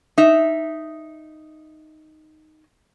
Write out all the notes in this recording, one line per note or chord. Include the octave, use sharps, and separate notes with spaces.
D#4 E5